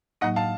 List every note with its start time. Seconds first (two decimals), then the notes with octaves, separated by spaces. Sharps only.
0.21 A2 F#3 A#3 D#4 D#5 F#5
0.36 F5 A5